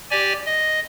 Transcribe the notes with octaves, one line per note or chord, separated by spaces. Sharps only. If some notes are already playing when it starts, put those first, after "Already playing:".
G4 D5 G#5
D#5